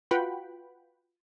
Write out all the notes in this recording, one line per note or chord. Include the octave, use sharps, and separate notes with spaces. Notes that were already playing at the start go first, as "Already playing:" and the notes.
F4 F#4 B4 F#5 G5 B5